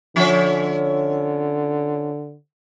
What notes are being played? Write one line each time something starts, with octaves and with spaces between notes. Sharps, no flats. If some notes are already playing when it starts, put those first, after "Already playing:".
D3 F3 C#4 E5